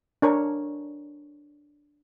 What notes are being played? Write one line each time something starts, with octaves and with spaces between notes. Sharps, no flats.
D4 A#4 C#5